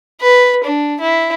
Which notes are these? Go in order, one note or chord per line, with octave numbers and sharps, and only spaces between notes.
B4
D4
E4